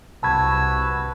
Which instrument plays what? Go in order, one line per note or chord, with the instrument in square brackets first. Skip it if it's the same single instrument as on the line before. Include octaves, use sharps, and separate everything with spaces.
[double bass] C2 [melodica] F#4 B4 E6 [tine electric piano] A5 B5 G#6